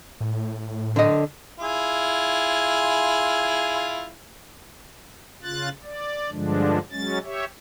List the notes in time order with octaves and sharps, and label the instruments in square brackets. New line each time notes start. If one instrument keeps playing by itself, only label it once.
[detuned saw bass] A2
[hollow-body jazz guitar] D3 D#5
[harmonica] E4 F4 G#4
[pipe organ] C#3 F4 F#6 A6
D5
G2 D3 F3 G#3 D4
F#3 G#3 C#4 A6
G4 C#5 E5